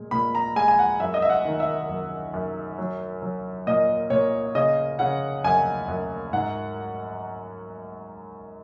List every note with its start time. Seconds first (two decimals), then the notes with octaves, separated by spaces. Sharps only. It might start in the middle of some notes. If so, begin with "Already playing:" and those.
Already playing: A#2 G#3
0.11 A#2 B5
0.35 A#5
0.56 G#3 G#5
0.68 G#5
0.79 F#5
1.00 F#2 E5
1.14 D#5
1.22 E5
1.30 F#5
1.45 D#3
1.60 E5
1.89 F#2
2.34 F#2
2.78 F#3
3.22 F#3
3.67 A#2 D#5
4.10 A#2 C#5
4.55 C#3 D#5
4.99 C#3 F#5
5.44 F#2 G#5
5.88 F#2
6.33 G#2 F#5